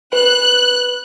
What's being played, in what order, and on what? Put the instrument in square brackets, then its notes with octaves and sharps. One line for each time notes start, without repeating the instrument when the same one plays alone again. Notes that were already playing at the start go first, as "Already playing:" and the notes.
[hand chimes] B4 [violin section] F#6